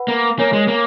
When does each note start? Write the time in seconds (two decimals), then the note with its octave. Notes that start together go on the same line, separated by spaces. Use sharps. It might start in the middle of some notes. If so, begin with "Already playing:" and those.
Already playing: B4 F#5 B5
0.08 A#3
0.39 A#3 A#4 C#5 G#5
0.53 G#3
0.68 A#3